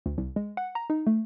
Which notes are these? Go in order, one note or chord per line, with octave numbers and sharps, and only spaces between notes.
D2
C2
G#3
F#5
A#5
D#4
A3